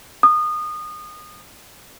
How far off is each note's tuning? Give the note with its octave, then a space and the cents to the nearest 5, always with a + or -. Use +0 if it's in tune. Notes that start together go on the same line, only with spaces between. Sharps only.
D#6 -25